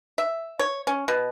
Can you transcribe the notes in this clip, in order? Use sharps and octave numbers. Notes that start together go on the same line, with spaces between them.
E5
C#5
C#4
B2